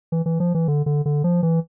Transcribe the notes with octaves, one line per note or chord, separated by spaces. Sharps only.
E3
E3
F3
E3
D3
D3
D3
F3
E3